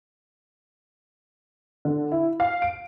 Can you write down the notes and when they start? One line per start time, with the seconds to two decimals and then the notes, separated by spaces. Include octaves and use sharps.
1.85 D3
2.12 E4
2.40 F5
2.62 D7